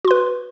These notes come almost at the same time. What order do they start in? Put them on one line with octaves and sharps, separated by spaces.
F#4 C6 B4